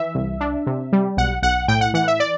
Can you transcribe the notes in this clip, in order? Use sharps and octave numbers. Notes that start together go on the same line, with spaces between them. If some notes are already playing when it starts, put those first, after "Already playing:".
Already playing: E3 E5
C2
D4
C3
G3
B1 F#5
B1 F#5
A2 G5
F#5
E3 F#5
E5
D5